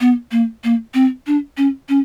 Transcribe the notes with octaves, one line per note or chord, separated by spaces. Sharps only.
B3
A#3
A#3
C4
D4
C#4
C#4